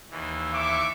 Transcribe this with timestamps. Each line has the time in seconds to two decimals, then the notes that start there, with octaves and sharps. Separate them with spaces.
0.10 D#2 E3
0.52 E5 C#6 D6